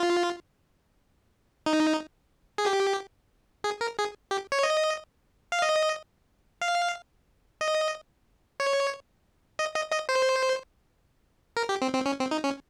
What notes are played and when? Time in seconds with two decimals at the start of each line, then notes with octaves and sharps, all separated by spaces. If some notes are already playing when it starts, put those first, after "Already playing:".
Already playing: F4
1.66 D#4
2.58 G#4
2.66 G4
3.64 G#4
3.81 A#4
3.98 G#4
4.31 G4
4.52 C#5
4.63 D#5
5.52 F5
5.62 D#5
6.61 F5
7.61 D#5
8.60 C#5
9.59 D#5
9.76 D#5
9.92 D#5
10.09 C5
11.57 A#4
11.69 G4
11.82 C4
11.94 C4
12.06 C#4
12.19 C4
12.31 D#4
12.44 C#4